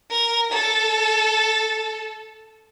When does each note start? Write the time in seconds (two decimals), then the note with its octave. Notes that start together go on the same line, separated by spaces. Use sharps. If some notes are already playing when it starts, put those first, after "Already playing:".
0.10 A#4
0.52 A4